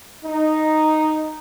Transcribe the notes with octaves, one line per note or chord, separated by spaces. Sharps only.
D#4